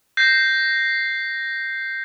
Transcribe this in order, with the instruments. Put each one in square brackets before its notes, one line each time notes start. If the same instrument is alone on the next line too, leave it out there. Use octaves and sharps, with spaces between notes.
[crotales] G6 A#6 C7